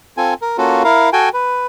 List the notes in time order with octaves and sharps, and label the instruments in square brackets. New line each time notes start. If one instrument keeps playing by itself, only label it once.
[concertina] C4 F4 A4 G#5
A#4
A#3 C#4 F4 F#4 A4
E4 A#4 F5
F#4 A4 G5 G#5
B4